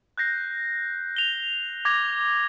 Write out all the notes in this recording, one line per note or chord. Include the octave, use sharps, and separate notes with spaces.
F#6 G6 A#6 C7
F7 G7
D6 G#6 A#6